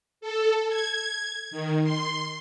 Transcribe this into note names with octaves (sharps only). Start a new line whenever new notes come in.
A4
G#6
D#3
C6